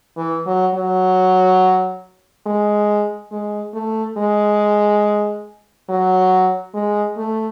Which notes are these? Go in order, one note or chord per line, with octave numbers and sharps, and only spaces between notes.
E3
F#3
F#3
G#3
G#3
A3
G#3
F#3
G#3
A3